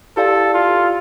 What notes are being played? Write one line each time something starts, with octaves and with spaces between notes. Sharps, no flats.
E4 G4 A4 D5 F5 A5
F4